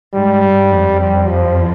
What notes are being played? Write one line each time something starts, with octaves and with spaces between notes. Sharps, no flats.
G#2 G3
G2
F2
G3
F3